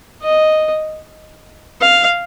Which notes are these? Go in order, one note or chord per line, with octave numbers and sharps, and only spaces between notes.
D#5
F5